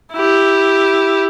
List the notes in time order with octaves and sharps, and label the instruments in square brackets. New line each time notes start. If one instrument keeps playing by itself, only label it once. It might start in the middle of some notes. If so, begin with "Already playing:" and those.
[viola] E4 G4